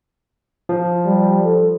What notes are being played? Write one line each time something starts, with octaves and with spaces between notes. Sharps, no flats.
F3
G3
A4